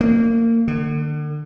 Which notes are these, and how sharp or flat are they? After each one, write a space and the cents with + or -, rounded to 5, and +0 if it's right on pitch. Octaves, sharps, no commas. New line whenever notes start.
A#3 -25
D3 +35